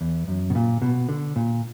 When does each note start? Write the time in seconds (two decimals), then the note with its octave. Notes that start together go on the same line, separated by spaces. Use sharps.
0.01 E2
0.28 F#2
0.50 B2
0.55 A#2
0.82 B2
1.09 D3
1.36 A#2